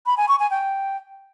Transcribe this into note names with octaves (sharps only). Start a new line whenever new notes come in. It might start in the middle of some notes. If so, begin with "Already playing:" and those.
B5
G#5
C#6
G#5
G5